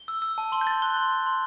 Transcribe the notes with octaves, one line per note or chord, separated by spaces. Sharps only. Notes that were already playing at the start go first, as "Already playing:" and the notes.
Already playing: G7
E6
E6
A5
C6 G7
G6
C6 A6
F#6 G7
C6
C6
C6